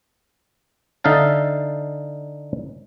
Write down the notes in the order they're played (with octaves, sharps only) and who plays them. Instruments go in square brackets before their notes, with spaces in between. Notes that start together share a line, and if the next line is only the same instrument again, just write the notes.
[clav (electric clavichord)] D3 D#4 E5 F5 A5